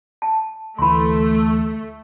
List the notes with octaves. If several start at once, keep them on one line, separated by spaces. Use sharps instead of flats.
A5
D2 E3 A3 B5 C6